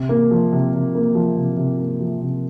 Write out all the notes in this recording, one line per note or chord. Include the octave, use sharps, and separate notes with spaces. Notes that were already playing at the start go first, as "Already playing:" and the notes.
Already playing: C3
A#3
F3
C3
C3
A#3
F3
C3
C3
A#3
F3
C3